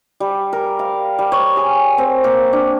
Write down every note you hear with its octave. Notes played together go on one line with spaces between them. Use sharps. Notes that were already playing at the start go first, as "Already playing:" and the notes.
G3
A#4
F5
G3
C#5
G#4
C4
A#3
D4